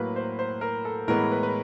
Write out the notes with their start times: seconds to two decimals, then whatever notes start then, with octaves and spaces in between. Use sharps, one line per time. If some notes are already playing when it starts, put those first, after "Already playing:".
Already playing: A2 F#3 A#3 A#4 B4
0.16 C5
0.39 C5
0.61 A#4
0.85 A4
1.08 A2 E3 G#3 B3 A#4
1.31 B4
1.43 B4